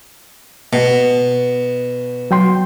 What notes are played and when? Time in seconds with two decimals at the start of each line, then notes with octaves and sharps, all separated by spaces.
0.73 B2
2.31 F#3 G5 C6